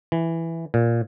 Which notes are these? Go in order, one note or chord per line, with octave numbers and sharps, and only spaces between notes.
E3
A#2